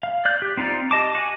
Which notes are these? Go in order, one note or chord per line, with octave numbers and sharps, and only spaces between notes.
F5
D5 F#6 G6
G4
C4 D#4 F4 D5
G4 D#5 A5 D6
F#4 D#5 G#5